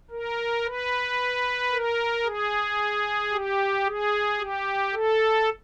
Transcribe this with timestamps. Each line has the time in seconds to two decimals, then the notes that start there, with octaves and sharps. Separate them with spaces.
0.11 A#4
0.65 B4
1.71 A#4
2.24 G#4
3.32 G4
3.86 G#4
4.39 G4
4.93 A4